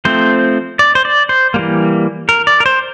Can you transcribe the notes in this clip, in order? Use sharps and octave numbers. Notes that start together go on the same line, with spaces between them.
F3 A3 C4 C5
D5
C5
D5
C5
E3 G3 A#3
A#4
D5
A#4
C5